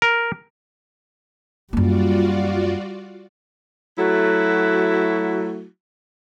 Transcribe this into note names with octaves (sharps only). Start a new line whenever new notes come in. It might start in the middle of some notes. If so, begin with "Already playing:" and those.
A#4
F#2 G3 A#3 F4 F#4 D5
F#3 A3 E4 F#4